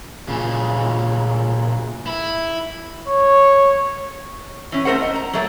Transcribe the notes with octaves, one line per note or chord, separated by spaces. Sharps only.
A#2 C#3
E4
C#5
E3 C#4
A3 C4 A#4 C5 F#5
D#5
A#5
F#3 A3 A#3